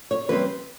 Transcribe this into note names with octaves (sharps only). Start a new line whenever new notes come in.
C#5
E3 G3 C4 B4